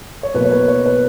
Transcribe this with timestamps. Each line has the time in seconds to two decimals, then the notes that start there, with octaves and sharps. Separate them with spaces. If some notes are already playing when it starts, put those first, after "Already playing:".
0.23 C#5
0.34 B2 F#3 A#3 B4
0.45 C#5
0.51 B4
0.68 C#5
0.86 B4